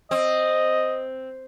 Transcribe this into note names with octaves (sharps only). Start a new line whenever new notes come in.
C4 D#5